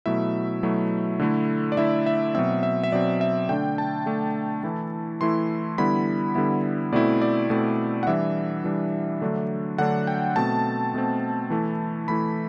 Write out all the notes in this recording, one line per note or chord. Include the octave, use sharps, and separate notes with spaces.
B2 F#3 A3 E4 E5
B2 F#3 A3 E4
D3 A3 E4
D5
D3 A3 E4 E5
E5
B2 F#3 C4 E5
E5
E5
B2 F#3 C4 D5
E5
D3 A3 D4 G5
A5
D3 A3 D4
E3 A3 E4
E3 A3 E4 C6
D3 G3 B3 E4 B5
D3 G3 B3 E4
B2 A3 C4 E4 D5
D5
B2 A3 C4 E4
F#5
E3 G3 D4 E5
E3 G3 D4
D3 F#3 A3 D4
D3 F#3 A3 D4 F#5
G5
B2 A3 C4 A5
B2 A3 C4
E3 A3 E4
E3 A3 E4 B5